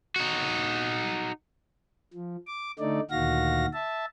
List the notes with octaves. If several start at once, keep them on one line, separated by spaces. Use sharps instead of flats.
D#4 F#4
F3
D6
D3 A3 D#4 D5
D2 A#2 D#3 F#4 F5 A#6
E5 A5